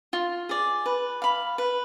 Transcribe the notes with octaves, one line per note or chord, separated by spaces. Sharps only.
F4
G#4 D5
B4
F5 B5
B4